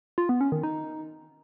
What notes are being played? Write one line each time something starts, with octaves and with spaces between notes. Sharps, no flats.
F4
B3
C#4
D#3
D#4